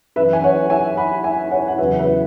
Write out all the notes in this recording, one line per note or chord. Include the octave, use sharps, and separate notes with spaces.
F#2 E3 B4 E5
G#5
C#5 F#5
E5 G#5
F#5 B5
E5 G#5
C#5 F#5
F#5
E2 C#3 F#3 B4 E5
B4 E5